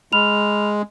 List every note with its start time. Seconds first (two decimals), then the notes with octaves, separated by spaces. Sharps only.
0.13 G#3 B5 F6 F7